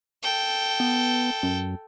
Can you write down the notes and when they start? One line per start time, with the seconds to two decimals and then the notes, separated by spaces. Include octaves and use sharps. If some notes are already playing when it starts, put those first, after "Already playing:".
0.23 A4 G5
0.80 B3
1.43 F#2